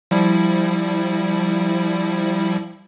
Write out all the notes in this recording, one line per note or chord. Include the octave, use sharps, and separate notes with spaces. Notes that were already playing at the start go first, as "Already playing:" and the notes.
F3 G3 E4